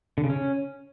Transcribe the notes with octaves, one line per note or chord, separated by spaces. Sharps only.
D3
C#3
C#4